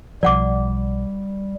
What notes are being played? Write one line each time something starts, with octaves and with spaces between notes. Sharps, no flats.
B1 F3 G3 D5 F#5 D6